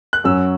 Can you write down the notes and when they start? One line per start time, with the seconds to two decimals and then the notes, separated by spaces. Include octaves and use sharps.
0.13 F#6
0.24 F#2 F#3 C#4 E6